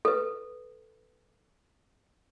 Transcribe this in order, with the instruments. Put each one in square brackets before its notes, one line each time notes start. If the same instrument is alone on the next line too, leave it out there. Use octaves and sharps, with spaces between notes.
[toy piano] A4 B4